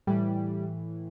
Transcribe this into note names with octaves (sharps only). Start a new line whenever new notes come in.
A2 E3 G3